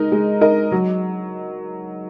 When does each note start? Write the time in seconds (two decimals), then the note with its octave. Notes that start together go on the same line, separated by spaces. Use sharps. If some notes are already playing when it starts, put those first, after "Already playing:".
Already playing: G#3 D#4 A#4 D#5
0.12 G#3
0.41 D#4 A#4 D#5
0.72 F#3